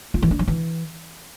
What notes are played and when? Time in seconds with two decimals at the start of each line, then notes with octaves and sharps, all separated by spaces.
0.14 F4
0.22 E3
0.31 D4
0.39 F3
0.48 E3